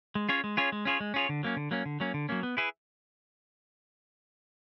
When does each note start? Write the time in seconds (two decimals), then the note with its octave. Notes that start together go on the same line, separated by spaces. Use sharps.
0.15 G#3
0.29 C#4 F4 G#4 C#5
0.44 G#3
0.57 C#4 F4 G#4 C#5
0.72 G#3
0.85 C#4 F4 G#4 C#5
1.00 G#3
1.14 C#4 F4 G#4 C#5
1.29 D3
1.43 F#3 A#3 C#4
1.57 D3
1.71 F#3 A#3 C#4
1.86 D3
2.00 F#3 A#3 C#4
2.14 D3
2.29 F#3 A#3 C#4
2.43 B3
2.57 E4 G#4 B4 E5